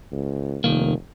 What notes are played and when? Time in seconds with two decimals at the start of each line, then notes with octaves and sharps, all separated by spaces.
0.12 C#2
0.64 F1 C2 D#3 A#3